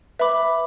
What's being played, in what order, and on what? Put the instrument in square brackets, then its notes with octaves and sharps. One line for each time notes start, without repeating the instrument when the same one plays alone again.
[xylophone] B4 E5 B5 D6